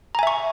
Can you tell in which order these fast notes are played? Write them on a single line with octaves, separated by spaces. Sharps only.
A#5 G#5 E5 C#6